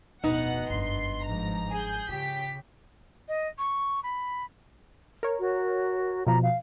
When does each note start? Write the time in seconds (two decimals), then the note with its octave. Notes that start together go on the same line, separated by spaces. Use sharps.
0.24 D1 F2 B2 B3 D#4 F#5
0.70 G1 F#2 D4 C6
1.24 G#2 F3 A#5
1.71 G#4 G6
2.08 C#3 F4 G4 B6
3.28 D#5
3.58 C#6
4.03 B5
5.23 A#4 C#5
5.39 F#4
6.27 B2 F3 A#5
6.43 F5